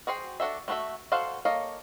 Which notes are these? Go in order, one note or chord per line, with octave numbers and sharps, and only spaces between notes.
F#4 G#4 C5 G5
D4 F#4 A4 E5
A3 C4 F#4 A4 E5
F#4 A4 C5 F5 F#5
A#3 A4 C#5 D#5 F5